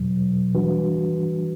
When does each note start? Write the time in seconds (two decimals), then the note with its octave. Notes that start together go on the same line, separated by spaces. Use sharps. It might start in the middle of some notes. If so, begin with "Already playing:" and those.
Already playing: E2 B2 F#3
0.54 E3 G3 D4 F#4 B4